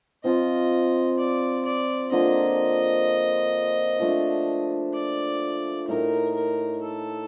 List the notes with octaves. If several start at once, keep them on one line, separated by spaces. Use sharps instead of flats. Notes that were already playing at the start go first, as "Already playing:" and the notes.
F3 C4 F4 D#5
D5
D5
D3 F3 A#3 D#5
F3 A3 D4
D5
A2 A3 D#4 A#4
A#4
A4